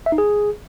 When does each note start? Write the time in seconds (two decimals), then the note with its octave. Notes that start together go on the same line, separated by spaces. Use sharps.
0.06 E5
0.12 D#4
0.18 G#4